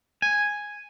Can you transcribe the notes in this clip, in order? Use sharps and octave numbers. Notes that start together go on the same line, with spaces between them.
G#5